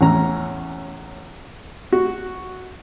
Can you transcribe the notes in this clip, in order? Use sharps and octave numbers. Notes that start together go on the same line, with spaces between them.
E2 A2 C#4 A#5
F#4